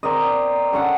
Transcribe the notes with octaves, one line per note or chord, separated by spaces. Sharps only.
C4 A#4 D5 D#5
D3 C#4 A4 F#5